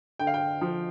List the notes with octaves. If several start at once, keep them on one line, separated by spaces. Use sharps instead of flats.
D3 G5
F5
G5
F3